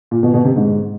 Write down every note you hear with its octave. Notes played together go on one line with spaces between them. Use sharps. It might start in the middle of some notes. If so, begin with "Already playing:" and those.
A#2
B2
B2
C3
G#2